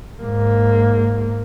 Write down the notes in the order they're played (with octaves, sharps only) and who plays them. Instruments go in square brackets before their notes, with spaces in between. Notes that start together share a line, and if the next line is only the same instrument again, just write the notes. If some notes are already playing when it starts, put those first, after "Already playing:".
[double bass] G#2 A#3